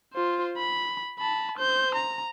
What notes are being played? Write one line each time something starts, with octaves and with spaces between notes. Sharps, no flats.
F4 C5
B5
A5 B5
C5 G6
A#5